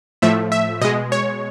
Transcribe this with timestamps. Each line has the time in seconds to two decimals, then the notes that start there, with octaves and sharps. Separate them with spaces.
0.22 A2 F3 A3 E5
0.52 E5
0.81 B2 G#3 D#5
1.12 C#5